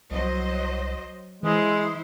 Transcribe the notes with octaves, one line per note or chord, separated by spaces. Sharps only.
C2 F#3 C5 D#5
E3 G#3 E4 C5 E5